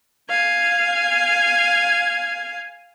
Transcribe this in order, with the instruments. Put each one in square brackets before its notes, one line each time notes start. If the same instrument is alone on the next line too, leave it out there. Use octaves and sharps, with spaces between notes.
[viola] F5 G#5